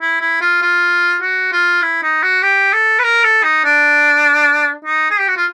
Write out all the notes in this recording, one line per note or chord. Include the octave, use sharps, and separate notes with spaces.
E4
E4
F4
F4
F#4
F4
E4
D#4
F#4
G4
A4
B4
A#4
A4
D#4
D4
D#4
G#4
G4
F#4
F4